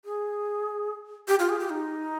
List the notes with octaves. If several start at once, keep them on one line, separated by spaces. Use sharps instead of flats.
G#4
G4
F4
G#4
G4
D#4